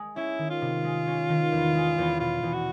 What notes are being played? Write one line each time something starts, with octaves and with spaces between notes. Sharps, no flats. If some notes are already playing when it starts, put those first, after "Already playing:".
Already playing: G#3
C#4 E4
D#3
F4
C3
G#3
C#4
D#3
E2
G#3
E2
B2 F4
E2
F#4